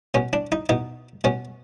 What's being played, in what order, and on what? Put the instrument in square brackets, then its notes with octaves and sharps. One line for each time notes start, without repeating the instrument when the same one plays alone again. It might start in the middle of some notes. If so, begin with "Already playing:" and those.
[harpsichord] B2 C#4
D4
D#4
B2 D#4
B2 C#4